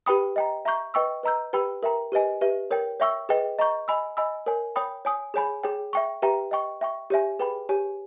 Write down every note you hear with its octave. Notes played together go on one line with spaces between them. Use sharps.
G4 B4 G5 B5 D#6
D#5 G5 A#5
E5 A#5 C#6 G6
B4 D#5 G5 C#6 E6
B4 D#5 A#5 E6 G6
G4 B4 G5 B5 E6
A#4 E5 G5 A#5
G4 B4 D#5 G#5
G4 B4 E5
A#4 C#5 G5
C#5 E5 G5 C#6 E6
G#4 B4 D#5 G5
D#5 A#5 C#6 G6
D#5 G#5 B5 E6
D#5 G#5 B5 E6
A#4 C#5 G#5
C#5 G5 B5 D#6
C#5 G#5 D#6
G#4 C#5 G#5 B5
G#4 C#5 G5
E5 G5 C#6
G4 B4 E5 G5 A#5
D#5 G5 C#6
E5 G5 C#6
G4 C#5 E5 G#5
G#4 B4 G5 B5
G4 C#5 G#5